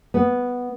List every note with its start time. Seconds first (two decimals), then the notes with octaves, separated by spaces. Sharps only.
0.14 B3